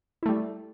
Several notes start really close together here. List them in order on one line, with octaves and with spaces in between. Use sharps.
E4 A3 G3